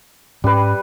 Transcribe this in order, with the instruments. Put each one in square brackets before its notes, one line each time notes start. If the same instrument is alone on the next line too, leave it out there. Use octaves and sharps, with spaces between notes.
[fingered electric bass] G#2 C#4 [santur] G3 B4